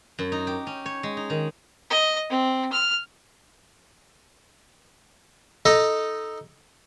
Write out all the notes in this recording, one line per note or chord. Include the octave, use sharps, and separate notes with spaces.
F#2
D#4
G4
C#4
C#5
G#3
D#4
D#3
D#5
C4
F6
D#4 A4 D#5